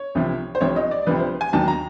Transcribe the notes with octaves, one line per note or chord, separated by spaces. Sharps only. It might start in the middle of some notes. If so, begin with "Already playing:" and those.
Already playing: C#5
C2 C3 F3
C5
C2 C3 F3 C#5
D#5
D5
C2 C3 F3 B4
C5
G#5
D#2 D#3 F#3 A5
A#5